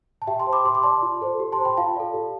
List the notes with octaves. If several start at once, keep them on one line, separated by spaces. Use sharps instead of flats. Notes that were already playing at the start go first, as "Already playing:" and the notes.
A5
G4 E5 G5
A5 C6
C5
B5 D6
G4 C6
D6
D5 A5 C6
F4
A4 C5
G4
A5 C6
C5
G5 B5
F4 F5 A5
A4 D5
G4